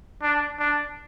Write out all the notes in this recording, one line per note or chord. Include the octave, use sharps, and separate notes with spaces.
D4
D4